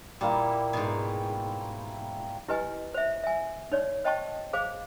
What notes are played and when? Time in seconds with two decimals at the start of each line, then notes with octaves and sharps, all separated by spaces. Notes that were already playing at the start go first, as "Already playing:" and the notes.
0.21 A#2 G3 A#3 E4
0.73 G#2 B2
2.48 E4 G4 B4 D#5 G#5
2.94 C5 E5
3.24 E5 G#5
3.72 D#4 C#5 D5
4.04 C5 D#5 G5 A5 C#6
4.53 G#4 C5 F5 D6